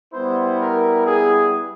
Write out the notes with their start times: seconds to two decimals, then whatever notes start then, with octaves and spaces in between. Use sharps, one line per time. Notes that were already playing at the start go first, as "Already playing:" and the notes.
0.14 G3 B3 E4 C5
0.60 A#4
1.05 G#4